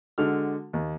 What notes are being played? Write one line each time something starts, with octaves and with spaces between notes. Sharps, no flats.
D3 G#3 F#4 A4 F6
D#2